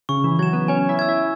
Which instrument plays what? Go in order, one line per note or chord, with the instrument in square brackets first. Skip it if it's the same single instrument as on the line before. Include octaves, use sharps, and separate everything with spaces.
[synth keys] C#3 [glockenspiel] C#6
[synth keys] E3
[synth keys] F#3 [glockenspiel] G#6 E7
[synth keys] B3
[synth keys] C#4 [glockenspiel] G#5
[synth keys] E4
[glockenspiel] E6 G#6
[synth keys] E4